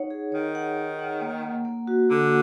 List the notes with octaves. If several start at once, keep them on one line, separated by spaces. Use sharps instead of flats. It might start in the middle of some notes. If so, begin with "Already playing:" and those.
Already playing: D#4 C#5 F#5
G#4
D#3 C#5
F#5
C#5
F#5
A#3
A#3
A#3
F#4
D3 A#3